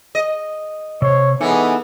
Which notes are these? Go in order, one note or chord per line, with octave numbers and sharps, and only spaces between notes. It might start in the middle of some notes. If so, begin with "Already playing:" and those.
D#5
C3 C5 C#5
E3 G#3 B3 D#4 A4 G#5